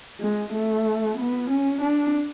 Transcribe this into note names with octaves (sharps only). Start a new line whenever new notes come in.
G#3
A3
B3
C#4
D4